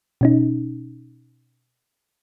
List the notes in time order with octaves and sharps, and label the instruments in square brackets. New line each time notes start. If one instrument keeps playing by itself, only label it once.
[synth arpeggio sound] B2 C#4 D#4